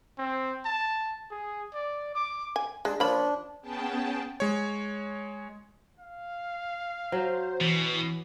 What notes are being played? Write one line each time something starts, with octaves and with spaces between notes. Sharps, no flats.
C4
A5
G#4
D5
D6
G#5
G#3 D4
F3 A#3 C#4 D4 B5
B3 C#4 G#4 G5 A5
G#3 C#5
F5
F#3 C5
B2 E3